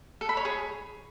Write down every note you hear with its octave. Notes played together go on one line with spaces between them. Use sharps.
A4
B5
C#5
G#4